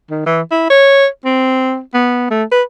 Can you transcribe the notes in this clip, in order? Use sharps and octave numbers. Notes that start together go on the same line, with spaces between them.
D#3
E3
E4
C#5
C4
B3
A3
B4